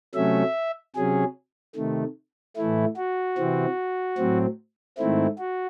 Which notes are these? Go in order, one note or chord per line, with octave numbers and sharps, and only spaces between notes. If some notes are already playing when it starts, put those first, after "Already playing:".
C3 F#3 A3 C#4 E5
C3 F#3 C#4 G#4
C3 D#3 A3
A2 E3 A3 E4
F#4
C3 E3 C4
A2 F#3 C4
G#2 D#3 A3 C4 E4
F#4